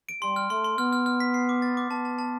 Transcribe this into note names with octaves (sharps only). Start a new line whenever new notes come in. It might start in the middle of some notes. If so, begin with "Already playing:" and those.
D7
G3 C6
F6
A3 C6
C6
B3 F6
F6
F6
B6
C7
D6
A6
D6
B3 A5
A5
A5